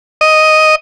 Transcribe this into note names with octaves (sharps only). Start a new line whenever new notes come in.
D#5